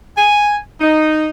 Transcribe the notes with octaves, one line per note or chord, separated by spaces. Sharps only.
G#5
D#4